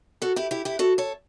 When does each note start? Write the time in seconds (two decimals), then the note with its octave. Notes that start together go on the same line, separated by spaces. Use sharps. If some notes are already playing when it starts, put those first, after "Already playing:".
0.22 F#4 A4
0.36 E4 G4
0.51 E4 G4
0.65 E4 G4
0.79 F#4 A4
0.98 A4 C#5